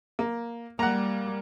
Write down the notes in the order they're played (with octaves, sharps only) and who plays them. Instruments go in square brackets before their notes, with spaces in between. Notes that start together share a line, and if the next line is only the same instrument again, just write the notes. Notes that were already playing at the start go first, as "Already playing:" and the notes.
[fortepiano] A#3
[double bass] G3 [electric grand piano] A#3 [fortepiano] F#5 A#5